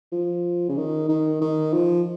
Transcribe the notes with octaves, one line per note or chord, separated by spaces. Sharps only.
F3
C#3
D#3
D#3
D#3
F3